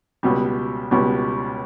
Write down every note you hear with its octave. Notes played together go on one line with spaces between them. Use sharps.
C#2 B2 G3
C#2 B2 G3